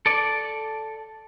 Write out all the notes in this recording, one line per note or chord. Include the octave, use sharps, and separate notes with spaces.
A4 D5